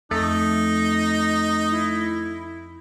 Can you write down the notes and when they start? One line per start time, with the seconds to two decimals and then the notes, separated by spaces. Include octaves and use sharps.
0.11 F2 A3 D#4
1.71 E4